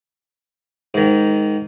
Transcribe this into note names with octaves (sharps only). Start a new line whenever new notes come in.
G#2 D#3